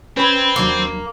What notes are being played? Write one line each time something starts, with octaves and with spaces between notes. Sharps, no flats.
C4 C#4 B4 B5 G#6
D#2 F#3 A#3 D4